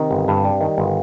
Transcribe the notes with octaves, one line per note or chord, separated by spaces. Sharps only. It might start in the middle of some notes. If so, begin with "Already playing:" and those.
Already playing: C3 D#3
G1
G2
G3
D#3
G1